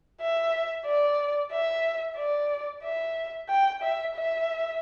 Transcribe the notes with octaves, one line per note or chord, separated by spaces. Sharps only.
E5
D5
E5
D5
E5
G5
E5
E5